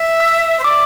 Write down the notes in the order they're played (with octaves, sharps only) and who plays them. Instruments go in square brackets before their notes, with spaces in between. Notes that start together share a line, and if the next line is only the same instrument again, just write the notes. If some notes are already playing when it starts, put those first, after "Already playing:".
Already playing: [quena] E5
[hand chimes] E6
[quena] C5
[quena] D5 [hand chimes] D6